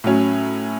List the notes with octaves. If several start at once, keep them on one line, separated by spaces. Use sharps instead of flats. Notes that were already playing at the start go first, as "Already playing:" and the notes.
A2 F#3 C#4